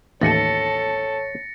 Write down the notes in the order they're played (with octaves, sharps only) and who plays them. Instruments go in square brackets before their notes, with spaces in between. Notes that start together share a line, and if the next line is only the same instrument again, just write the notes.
[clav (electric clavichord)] A1 D#2 A3 [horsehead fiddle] A4 [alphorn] C#5 [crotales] A6 A#6 C#7